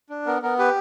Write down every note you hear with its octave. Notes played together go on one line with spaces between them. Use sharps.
D4
B3 A#4
B3 A#4
G4 B4